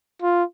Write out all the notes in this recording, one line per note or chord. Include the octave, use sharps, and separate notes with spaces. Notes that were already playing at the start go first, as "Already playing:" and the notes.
F4